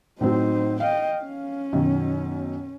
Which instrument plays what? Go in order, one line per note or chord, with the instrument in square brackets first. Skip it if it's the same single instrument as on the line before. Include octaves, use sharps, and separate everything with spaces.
[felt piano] A2 F#3 C4 [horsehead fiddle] D#4 C5
[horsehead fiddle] D#5 G5 [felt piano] F5
[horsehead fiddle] C#4
[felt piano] F#2 B2 D#3